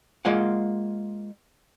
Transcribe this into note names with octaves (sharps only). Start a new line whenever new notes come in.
G#3 A#3 F4 F5 F#5